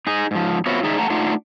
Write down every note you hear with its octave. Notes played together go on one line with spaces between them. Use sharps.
D#4 G#4
G#2 F3
B3 C4 F4 F#4 C#5 E5
A2 D#3 D#4 G#4 D5 E5
A3 F#5 A5 A#5
A3 D4 D#4 F4 F#5